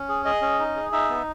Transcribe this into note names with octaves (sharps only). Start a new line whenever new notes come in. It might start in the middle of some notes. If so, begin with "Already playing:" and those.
Already playing: C#4
G#4
G#4 D#5
C#4
D#4
G#4
D#4 E5
B3